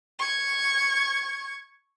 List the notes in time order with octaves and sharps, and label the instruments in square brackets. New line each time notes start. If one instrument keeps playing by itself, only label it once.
[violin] C#6 G#6